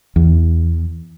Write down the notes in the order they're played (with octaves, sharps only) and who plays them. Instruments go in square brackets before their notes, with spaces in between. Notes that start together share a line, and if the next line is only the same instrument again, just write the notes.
[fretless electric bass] E2